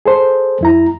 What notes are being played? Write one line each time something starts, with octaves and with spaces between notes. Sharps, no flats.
G#4 A4 C5
F2 E4 A#5